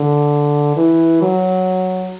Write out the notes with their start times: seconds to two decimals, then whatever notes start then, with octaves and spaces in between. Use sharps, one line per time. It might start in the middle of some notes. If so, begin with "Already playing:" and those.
Already playing: D3
0.77 E3
1.22 F#3